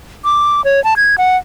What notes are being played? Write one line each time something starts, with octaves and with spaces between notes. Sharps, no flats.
D6
C#5
A5
G#6
F#5